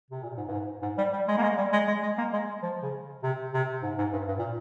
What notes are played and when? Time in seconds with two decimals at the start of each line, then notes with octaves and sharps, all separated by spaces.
0.11 C3
0.23 A#2
0.37 G#2
0.48 G2
0.53 G#2
0.82 G#2
0.98 G3
1.13 G3
1.28 G#3
1.38 A#3
1.43 G#3
1.58 G3
1.73 G#3
1.88 G#3
2.03 G#3
2.18 A#3
2.33 G#3
2.63 F3
2.83 C#3
3.23 C3
3.54 C3
3.83 G#2
3.98 G#2
4.13 G2
4.28 G2
4.39 A#2